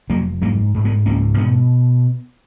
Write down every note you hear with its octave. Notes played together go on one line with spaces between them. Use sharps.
F1 F#3 A#3
G#2 F#3 A#3
G#2
G#3 B3
C#2 A#3 C#4
B2 G#3 B3